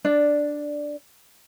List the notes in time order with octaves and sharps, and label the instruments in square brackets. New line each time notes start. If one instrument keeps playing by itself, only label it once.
[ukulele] D4 D5